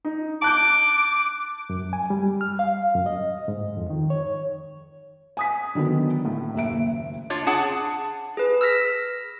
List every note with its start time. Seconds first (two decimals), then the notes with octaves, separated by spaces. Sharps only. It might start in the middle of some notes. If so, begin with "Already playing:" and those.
0.05 D#4
0.42 A5 D6 F#6 G6
1.70 F#2
1.93 G#5
2.10 G3
2.41 F6
2.59 F5
2.95 F#2
3.06 D#5
3.48 G#2
3.77 F2
3.90 D#3
4.10 C#5
5.37 G#5 D#6 B6
5.75 D3 D#3 F#3 B3 D4
6.25 A2
6.54 F#1 D#2 E5 D7
7.30 D4 F4 C#5
7.47 D4 G#4 F#5 A5
8.37 G#4 B4
8.61 E6 F6 A#6 B6